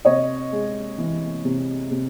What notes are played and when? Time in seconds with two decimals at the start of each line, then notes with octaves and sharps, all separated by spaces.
0.05 C3 C#5 D#5
0.52 G#3
0.98 E3
1.45 C3
1.91 C3